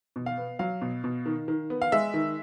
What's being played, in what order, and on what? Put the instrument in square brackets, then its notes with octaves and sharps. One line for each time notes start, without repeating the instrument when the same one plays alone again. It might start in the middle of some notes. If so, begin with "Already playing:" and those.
[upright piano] B2
F5
B3
F#3 F5
B2
B2
D#3
D#3
B3
F5
G#3 E5
D#3